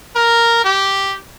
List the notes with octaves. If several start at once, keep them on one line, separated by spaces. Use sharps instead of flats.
A#4
G4